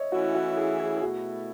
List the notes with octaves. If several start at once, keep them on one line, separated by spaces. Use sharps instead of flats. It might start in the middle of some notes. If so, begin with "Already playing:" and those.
Already playing: C#5 D#5 E5
E3 A3 C#4 E4 F#4
F#4
G#4
G#4
G#4
B2 A3 E4 F#4